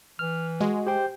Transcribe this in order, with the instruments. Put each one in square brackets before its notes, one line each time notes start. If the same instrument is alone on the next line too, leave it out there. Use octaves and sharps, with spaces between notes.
[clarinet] E3 [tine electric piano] F6
[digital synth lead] G#3 [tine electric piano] F#4
[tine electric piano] G4 G5 [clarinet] C5